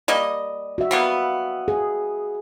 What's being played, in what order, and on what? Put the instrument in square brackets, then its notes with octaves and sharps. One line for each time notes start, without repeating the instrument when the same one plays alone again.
[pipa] G3 A#3 D#5
[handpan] F#4 E5
[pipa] G3 A#3 B3
[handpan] G#4